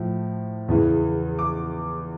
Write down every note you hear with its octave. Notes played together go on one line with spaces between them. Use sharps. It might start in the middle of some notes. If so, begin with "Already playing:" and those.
Already playing: A2 F3
E2 C#3 E3
D6